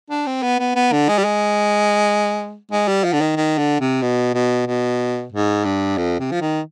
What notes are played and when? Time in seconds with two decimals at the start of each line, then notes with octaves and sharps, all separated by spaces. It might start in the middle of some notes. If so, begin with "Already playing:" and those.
0.10 D4
0.26 C4
0.42 B3
0.59 B3
0.75 B3
0.92 D3
1.08 G#3
1.18 G3
1.25 G#3
2.71 G#3
2.88 G3
3.04 F3
3.13 D3
3.21 D#3
3.36 D#3
3.58 D3
3.80 C3
4.02 B2
4.34 B2
4.67 B2
5.32 G#2
5.65 G2
5.97 F2
6.19 C3
6.31 F3
6.41 D#3